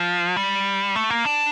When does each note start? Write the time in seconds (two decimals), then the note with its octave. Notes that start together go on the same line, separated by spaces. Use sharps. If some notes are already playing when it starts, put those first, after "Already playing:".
Already playing: F3
0.36 G3
0.95 A3
1.10 A#3
1.25 D4